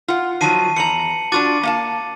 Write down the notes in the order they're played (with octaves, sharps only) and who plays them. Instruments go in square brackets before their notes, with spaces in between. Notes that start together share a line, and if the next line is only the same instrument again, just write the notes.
[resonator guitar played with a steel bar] F4 F#5
[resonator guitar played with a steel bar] D#3 F3 F#3 [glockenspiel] A5 C7 D#7
[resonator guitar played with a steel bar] E2 A#5 [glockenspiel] C#7 F#7
[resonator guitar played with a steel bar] D4 F4 F#4 [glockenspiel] D6 A6 D#7
[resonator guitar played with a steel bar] A#3 F5 A5